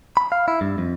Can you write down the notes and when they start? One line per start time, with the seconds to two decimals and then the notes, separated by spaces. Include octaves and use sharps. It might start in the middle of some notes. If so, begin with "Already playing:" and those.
0.17 B5
0.32 F5
0.48 E4
0.61 G2
0.78 F2